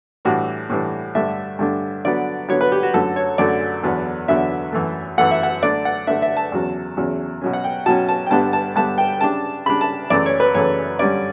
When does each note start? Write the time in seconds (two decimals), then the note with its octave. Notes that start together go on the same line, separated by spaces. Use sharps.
0.25 A2 E3 G3 D4 F#4
0.70 A2 E3 G3 D4
1.15 G2 D3 A3 D4 E5
1.59 G2 D3 A3 D4
2.05 D3 F#3 B3 D5
2.49 D3 F#3 B3 C#5
2.61 B4
2.72 G4
2.83 F#4
2.94 F#2 D3 F#3 A3 A4
3.16 C#5
3.38 F#2 D3 F#3 A3 D5
3.83 E2 D3 F#3 B3 D4
4.28 E2 D3 F#3 B3 D4 E5
4.72 F#2 E3 A3
5.18 F#2 E3 A3 F#5
5.31 E5
5.43 F#5
5.62 D3 A3 D4 D5
5.85 F#5
6.07 D3 A3 D4 E5
6.22 E5
6.37 A5
6.52 E2 C#3 F#3
6.97 E2 C#3 F#3
7.42 B2 F#3 C#4
7.53 F#5
7.64 G5
7.86 B2 F#3 C#4 A5
8.09 A5
8.27 G5
8.31 G2 D3 G3 B3 D4 A5
8.53 A5
8.76 G2 D3 G3 B3 D4 A5
8.98 G5
9.21 C#3 G3 D4 A5
9.66 C#3 G3 D4 B5
9.81 A5
10.10 F#2 C#3 E3 A3 D5
10.26 C#5
10.40 B4
10.55 F#2 C#3 E3 A3 C#5
10.99 G2 D3 G3 C#4 D5